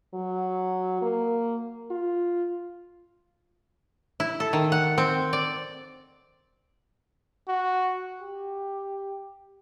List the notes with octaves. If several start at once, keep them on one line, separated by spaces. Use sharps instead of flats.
F#3
A#3
F4
E4
A4
D#3
F#5
C4
D5
F#4
G4